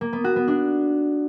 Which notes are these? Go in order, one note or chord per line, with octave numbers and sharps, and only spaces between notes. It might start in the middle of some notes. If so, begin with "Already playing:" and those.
A#3
B3
F#4
B3
D4